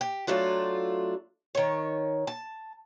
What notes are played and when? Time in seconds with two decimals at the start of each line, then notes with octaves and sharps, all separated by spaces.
0.01 G4
0.27 F#3 A3 D4 F4
1.55 D#3 C#5
2.27 A5